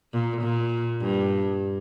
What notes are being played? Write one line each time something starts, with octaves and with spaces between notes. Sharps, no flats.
A#2
A#2
G2